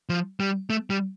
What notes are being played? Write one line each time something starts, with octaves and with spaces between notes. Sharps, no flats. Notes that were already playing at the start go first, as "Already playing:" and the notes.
F3
G3
A3
G3